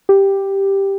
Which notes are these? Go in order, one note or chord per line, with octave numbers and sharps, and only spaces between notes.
G4